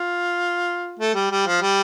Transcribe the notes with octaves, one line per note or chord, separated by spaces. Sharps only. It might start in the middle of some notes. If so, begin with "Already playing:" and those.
Already playing: F4
A3
G3
G3
F3
G3